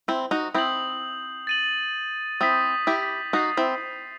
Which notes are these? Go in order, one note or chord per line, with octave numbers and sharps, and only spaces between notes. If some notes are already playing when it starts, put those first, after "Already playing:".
C4 E4
D#4 F#4
C4 E4 D#6 G6 C7 F#7
A6 D#7 F#7
C4 E4 D#6 G6 B6
E4 G4
D#4 F#4 D#6 A6 C7
C4 E4